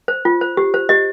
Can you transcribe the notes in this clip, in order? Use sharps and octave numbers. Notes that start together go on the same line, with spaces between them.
C5
F4
C5
G4
C5
G4 D#5